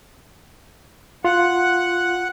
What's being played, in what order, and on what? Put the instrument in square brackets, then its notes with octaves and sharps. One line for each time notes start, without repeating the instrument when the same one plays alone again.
[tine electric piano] F4 [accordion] F#5